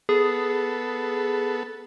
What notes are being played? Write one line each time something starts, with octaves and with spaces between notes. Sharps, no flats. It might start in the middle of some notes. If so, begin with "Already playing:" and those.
B3 G#4 A4